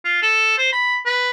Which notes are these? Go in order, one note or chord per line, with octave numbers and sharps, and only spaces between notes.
F4
A4
C5
B5
B4